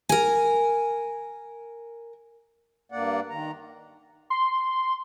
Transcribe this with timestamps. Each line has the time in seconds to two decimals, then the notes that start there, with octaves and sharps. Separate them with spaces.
0.09 A#4 G#5
2.92 G2 A#3 D5 F#5
3.30 D#3 A#5
4.30 C6